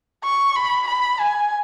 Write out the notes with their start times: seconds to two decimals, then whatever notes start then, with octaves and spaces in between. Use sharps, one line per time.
0.24 C#6
0.55 B5
0.87 B5
1.20 G#5